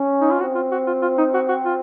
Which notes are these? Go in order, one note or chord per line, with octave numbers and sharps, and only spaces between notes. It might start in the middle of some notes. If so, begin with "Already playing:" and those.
Already playing: C#4
D#4
F4
C4 F#4
F4
F#4
F4
F4
D#4
F#4
F#4
F4